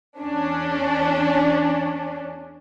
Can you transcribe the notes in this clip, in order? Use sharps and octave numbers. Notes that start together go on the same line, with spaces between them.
E2 C#4 D4